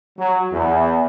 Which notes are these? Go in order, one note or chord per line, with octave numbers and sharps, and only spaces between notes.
F#3
E2